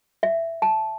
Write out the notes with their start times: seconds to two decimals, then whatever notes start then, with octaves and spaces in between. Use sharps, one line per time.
0.23 E5
0.62 A5